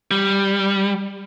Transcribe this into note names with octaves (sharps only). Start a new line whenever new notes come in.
G3